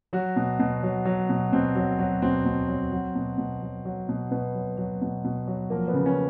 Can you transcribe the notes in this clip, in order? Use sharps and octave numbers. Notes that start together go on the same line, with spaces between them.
F#3 F#4
B2
B2
F#3
F#3
B2
B2 C4
F#3
F#3
B2 C4
B2
F#3
F#3
B2
B2
F#3
F#3
B2
B2 B3
F#3
F#3
B2
B2
F#3
F3 A#3
B3
C#3
C#4